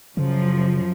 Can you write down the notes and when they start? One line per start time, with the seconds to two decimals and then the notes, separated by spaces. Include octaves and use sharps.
0.17 F#2 C#3 F3